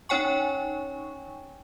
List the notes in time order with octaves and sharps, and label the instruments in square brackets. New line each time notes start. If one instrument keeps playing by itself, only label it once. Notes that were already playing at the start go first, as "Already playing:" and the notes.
[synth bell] C#4 D#4 C#5 G5 G#5 C#6